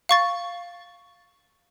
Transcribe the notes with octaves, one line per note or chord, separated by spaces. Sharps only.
F5 C#6 A6